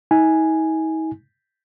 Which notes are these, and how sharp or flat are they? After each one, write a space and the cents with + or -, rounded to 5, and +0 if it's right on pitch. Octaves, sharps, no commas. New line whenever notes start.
D#4 +45 G#5 +0